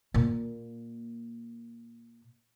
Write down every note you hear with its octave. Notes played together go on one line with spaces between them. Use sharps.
A#2 A#3